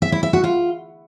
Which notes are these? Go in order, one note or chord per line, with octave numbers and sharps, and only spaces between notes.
E5
E4
E5
F#4
F4